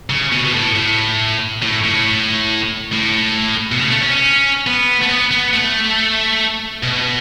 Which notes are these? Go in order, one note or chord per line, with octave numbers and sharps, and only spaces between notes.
C#3
B2
B2
A2
A2
A2
A2
A2
B2
C#3
A3
C#4
C#4
B3
A3
B3
B3
A3
B2